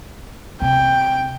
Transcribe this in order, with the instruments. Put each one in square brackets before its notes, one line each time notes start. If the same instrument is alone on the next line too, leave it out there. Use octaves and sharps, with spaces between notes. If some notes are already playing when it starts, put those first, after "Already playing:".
[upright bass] C3 [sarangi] G5